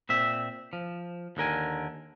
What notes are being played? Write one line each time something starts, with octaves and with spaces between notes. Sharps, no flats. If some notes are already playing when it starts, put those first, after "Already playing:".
A#2 C4 E5
F3
D#2 D3 A#4 G#5